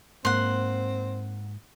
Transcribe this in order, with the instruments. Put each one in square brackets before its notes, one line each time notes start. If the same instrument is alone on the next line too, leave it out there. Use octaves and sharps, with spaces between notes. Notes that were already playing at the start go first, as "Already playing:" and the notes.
[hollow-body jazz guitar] G#2 A#3 [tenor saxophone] C4 [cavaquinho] F#5 C6